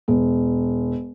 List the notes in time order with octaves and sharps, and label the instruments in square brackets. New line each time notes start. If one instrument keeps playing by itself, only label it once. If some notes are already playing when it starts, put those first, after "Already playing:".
[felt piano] E1